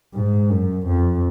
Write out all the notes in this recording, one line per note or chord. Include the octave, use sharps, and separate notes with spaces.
G#2
F#2
F2